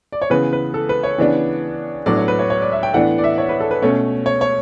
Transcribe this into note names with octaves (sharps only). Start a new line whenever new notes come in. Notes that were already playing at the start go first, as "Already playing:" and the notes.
D5
C#5
C#3 E3 B3 B4
B4
A4
B4
C#5
C#3 E3 B3 D4
A2 F#3 B3 D4 D5
C#5
B4
C#5
C#5
D5
E5
G5
A2 E3 B3 D4 F#5
D5
E5
C#5
B4
A4
B4
B2 A3 C#4 C#5
C#5
C#5